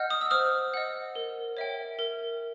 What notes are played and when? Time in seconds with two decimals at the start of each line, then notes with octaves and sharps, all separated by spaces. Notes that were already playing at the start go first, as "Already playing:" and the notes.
Already playing: D#5 F#5 F6 G6
0.10 D#6
0.21 E6
0.31 C5 D#6 F6
0.74 D#5 F#5
1.15 A#4
1.57 C#5 E5 G5
1.99 A#4